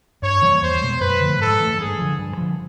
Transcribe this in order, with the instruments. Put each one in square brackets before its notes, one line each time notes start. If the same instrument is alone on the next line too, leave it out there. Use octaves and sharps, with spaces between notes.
[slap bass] G2 [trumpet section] C#5
[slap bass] E3 G3 A#3
[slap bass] E2 [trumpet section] C5
[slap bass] B2 G#3
[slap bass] F#2 [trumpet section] B4
[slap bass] D3 F3 A3
[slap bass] G#2 [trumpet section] A4
[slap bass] E3 A3
[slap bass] G2 [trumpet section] G#4
[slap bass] D3 F3
G2
D3 F3